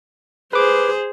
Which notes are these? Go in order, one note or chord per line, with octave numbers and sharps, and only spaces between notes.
G#4 B4 C5 D6